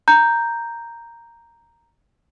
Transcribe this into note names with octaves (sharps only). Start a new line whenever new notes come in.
A#5 G6